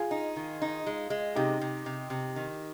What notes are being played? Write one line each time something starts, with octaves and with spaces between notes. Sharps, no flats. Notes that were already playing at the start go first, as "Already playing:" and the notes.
Already playing: F4 G#4
D#4
D#3
D#4
G#3
G#3
C3 D#4 G4
C3
C3
C3
D#3